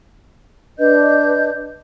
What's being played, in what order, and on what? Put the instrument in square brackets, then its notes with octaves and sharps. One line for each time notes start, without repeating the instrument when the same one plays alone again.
[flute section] D4 B4 D#5 G6